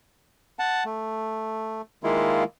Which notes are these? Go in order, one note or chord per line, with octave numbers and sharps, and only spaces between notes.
F#5 A5
A3
D#3 G#3 A#3 E4 F4